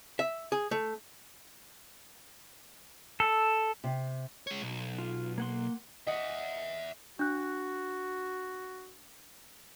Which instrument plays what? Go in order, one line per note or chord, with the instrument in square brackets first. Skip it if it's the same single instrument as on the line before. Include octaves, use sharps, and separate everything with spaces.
[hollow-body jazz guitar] E5
G#4
A3
[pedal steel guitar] A4
[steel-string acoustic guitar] C3
[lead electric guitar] G#3 C#5
B1
[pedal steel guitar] F4
A#3 F#5 C6
[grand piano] D#5 [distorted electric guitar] E5 F#5
[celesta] D4 F#6 [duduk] F#4